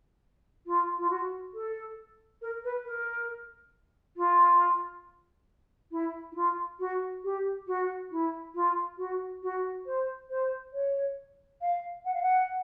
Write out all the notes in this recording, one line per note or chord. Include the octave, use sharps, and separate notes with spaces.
F4
F4
F#4
A4
A#4
B4
A#4
F4
E4
E4
F4
F#4
G4
F#4
E4
F4
F#4
F#4
C5
C5
C#5
F5
F#5
F5
F#5